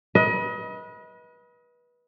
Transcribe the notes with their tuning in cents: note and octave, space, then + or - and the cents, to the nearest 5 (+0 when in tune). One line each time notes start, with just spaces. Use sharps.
B4 -25 D#5 +30